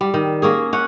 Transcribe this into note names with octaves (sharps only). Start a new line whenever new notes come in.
G3
D#3
A#3 C#4 G#4
C#4 F#5